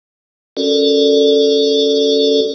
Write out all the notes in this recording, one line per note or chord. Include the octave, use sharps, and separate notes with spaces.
C#4 F#4 A4 A#4 D5